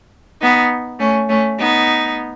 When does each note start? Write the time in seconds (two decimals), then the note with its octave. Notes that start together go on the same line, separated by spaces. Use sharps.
0.41 B3 D#4
0.99 A3 C#4
1.29 A3 C#4
1.58 B3 D#4